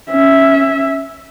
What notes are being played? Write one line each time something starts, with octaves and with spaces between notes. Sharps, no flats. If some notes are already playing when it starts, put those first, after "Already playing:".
C#4 E5